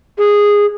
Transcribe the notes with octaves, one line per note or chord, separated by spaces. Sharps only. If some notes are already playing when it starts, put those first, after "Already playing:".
G#4